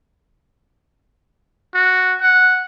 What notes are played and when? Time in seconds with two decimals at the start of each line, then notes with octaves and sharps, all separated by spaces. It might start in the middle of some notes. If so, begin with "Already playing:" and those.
1.75 F#4
2.21 F#5